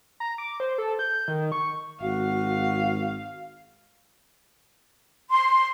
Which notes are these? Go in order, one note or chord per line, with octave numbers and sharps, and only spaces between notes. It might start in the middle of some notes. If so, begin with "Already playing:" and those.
A#5
D6
C5
A4
G6
D#3
C#6
G#1 F#4 F5
C6